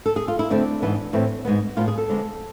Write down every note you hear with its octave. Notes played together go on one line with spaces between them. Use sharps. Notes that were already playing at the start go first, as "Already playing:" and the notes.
A4
G#4
F4
E4
E2 D3 A3 C4 D4
G#2 E3 B3
A2 E3 A3 C4
G#2 G#3 B3
A2 G#3 B3 F4
G#4
A4
F2 D3 G#3 B3